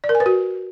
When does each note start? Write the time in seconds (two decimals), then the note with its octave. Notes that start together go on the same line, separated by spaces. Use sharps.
0.04 D5
0.09 A#4
0.15 G#5
0.20 B4
0.26 F#4